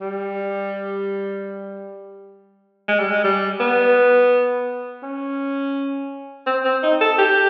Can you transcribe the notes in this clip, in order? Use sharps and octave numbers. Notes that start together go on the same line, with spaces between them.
G3
G#3
G3
G#3
G3
B3
C#4
C4
C4
D#4
A4
G4